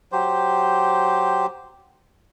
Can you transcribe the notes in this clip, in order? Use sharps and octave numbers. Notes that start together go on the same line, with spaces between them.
F#3 G4 C5